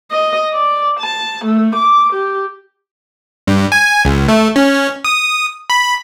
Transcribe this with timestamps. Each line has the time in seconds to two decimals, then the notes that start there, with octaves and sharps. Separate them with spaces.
0.12 D#5
0.53 D5
1.00 A5
1.45 A3
1.75 D6
2.13 G4
3.47 G2
3.72 G#5
4.05 C#2
4.29 A3
4.56 C#4
5.05 D#6
5.70 B5